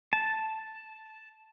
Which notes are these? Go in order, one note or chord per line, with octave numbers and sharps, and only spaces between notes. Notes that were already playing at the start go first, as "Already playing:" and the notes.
A5